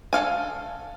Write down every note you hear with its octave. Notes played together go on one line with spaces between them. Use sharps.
A4 F5 G#5